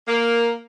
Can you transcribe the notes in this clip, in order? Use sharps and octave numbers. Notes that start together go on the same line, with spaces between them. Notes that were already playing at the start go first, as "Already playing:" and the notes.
A#3